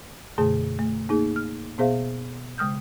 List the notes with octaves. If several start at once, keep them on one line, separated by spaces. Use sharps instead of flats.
F#2 B2 D3 A3 G#4 A5
A3
A#3 D#4 G#4
F6
B2 B3 G#4 C5 E5 F5
C#3 G#3 D#6 F6 G6